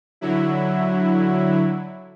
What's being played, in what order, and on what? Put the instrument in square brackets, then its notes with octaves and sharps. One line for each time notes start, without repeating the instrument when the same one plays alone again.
[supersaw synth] D3 F#3 E4